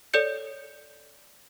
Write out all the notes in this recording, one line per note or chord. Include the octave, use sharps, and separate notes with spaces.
A4 C#5 D5 G6 C#7